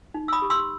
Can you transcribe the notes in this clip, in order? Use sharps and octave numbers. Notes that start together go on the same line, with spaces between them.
D#4
E6
B5 D#6
G4
C6 E6